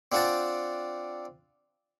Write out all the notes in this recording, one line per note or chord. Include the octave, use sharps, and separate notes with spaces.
C4 D4 F4 F#5 G5 A5